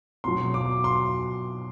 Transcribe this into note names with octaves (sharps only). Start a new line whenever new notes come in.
B2 F#3 C6
D6
C6